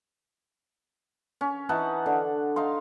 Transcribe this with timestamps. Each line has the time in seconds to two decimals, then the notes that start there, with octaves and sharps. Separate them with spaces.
1.41 C#4
1.69 E3 D#4 F#5 A5
2.06 D3
2.56 D#4 F5 C6